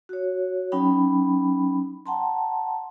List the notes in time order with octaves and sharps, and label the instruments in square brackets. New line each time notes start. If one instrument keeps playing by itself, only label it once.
[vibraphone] F#4 C#5
F#3 C#4 D#4 G5 B5
F#5 G5 A5 A#5 C6